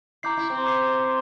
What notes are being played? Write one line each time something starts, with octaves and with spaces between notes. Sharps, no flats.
E4 A#5 D6 G6 C7
E4
C4
A#5 D6 G6 C7
C6